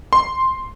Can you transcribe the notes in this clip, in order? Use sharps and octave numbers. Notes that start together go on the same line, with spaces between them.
C6